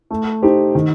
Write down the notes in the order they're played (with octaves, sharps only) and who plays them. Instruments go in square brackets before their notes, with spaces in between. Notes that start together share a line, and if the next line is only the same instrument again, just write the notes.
[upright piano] A3
D#4 G4 C5
D#3